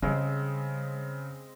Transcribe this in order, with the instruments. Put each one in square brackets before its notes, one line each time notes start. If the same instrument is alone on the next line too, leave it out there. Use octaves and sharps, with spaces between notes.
[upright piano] C#3 [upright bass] G3 [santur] G#3 C4